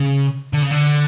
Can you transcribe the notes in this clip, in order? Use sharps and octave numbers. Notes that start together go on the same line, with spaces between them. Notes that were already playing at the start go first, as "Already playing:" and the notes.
Already playing: C#3
D3
C#3
D3